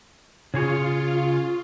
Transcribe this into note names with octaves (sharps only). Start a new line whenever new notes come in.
C#3 F4 G#4 C#5